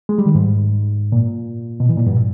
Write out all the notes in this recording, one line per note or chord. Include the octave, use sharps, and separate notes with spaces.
G#3
G3
D#3
G#2
A#2
B2
E3
A#2
G2